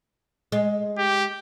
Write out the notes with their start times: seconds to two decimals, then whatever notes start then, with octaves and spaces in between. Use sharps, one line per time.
0.52 G#3
0.98 G4